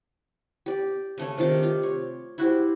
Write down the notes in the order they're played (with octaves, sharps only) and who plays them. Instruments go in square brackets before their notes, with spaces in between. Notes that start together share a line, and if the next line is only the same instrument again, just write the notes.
[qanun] G4 D5
C#3 A3 C#4
C3 D#3 F4 D6
F4
C#5
E4 F#4 G4 C5